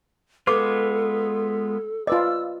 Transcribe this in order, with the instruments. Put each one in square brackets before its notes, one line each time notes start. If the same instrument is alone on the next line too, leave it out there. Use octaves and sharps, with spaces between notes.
[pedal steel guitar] G#3 B3 F4 [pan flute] A4 [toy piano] B4 D6
[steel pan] F4 B4 D5 [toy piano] D#5 [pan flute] E6